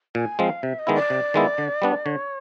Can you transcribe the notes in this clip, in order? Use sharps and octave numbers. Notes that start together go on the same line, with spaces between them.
A#2 G#5
F3 G#3 C4 F5
C3 E5
D#5
D#3 G#3 B3 E4
D5
C3
D#3 G#3 B3 E4
D3
G3 B3 D4
D3 C#5